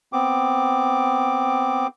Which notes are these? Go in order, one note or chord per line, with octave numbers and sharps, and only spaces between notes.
B3 C4 D6